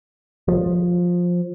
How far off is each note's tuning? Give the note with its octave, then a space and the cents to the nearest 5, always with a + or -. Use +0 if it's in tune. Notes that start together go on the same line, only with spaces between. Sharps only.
F3 +15